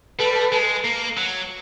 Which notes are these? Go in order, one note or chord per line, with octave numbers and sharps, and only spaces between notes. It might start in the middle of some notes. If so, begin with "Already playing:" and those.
G3 A4 B4
G#3
A#3
F#3